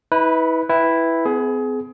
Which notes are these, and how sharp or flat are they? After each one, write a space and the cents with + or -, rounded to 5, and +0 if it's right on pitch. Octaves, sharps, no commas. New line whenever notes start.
E4 -35 B4 +0
E4 +0 B4 +0 G5 +0
C4 -45 G#4 +25